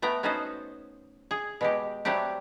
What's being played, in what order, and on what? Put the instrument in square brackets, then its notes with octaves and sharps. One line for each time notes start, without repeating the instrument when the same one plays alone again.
[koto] A3 B3 G5 A#5
B3 C#4 D#4 F#4 A4 C5
G#4
B2 G#3 G4
F#3 G3 A3 C4 G4